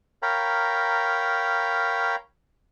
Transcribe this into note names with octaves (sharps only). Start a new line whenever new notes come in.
A#4 C#5 F5 G5 A#5 B5